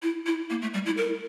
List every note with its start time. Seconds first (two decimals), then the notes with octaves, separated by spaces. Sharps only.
0.03 E4
0.26 E4
0.50 A#3
0.62 A3
0.74 G3
0.86 E4
0.97 A#4